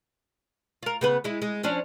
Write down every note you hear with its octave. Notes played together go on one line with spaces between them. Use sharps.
F4 A#4
C#3 B3 B4
G#3 E4
G#3
F3 C#4 D4